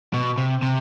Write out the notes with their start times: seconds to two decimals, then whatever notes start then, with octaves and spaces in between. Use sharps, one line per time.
0.13 B2
0.38 C3
0.62 C3